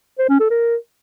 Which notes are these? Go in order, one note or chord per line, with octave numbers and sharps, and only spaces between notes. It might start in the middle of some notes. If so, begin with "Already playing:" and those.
C5
C#4
A4
A#4